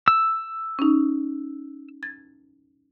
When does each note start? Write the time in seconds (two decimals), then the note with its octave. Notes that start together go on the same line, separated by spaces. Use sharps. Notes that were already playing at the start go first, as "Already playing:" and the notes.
0.08 E6
0.79 C#4 D#4
2.03 G#6 A6